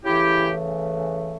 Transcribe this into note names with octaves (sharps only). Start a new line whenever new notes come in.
C#3 E3 A3 E4 G4